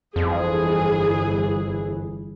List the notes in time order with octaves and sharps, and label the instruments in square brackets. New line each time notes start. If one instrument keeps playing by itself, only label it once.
[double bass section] G1 E3 [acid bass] F2 [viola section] G#4